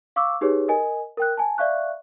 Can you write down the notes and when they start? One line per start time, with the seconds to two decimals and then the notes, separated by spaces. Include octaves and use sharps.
0.16 F5 C#6 D6 E6
0.41 D#4 G4 G#4 B4 C#5
0.68 A#4 D#5 G#5
1.17 A#4 G5 F#6
1.37 G#5 A5
1.58 D5 E5 F5 C#6 F#6